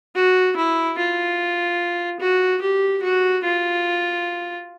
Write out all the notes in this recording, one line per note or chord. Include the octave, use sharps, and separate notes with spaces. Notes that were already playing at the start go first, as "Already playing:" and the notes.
F#4
E4
F4
F#4
G4
F#4
F4